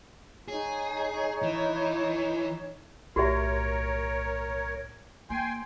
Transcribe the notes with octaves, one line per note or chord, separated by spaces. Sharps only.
D#4 G#4 C#5
E3
B1 A2 F#4 G4 A#4 C#5 E5
A#3 G5 G#5 C6